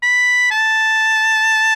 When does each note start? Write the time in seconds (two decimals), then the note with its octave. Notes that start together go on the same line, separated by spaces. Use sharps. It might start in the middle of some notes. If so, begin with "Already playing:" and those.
0.03 B5
0.51 A5